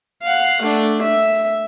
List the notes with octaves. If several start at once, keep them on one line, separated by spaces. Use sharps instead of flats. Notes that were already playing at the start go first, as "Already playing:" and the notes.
F5 F#5
A3 D4
E5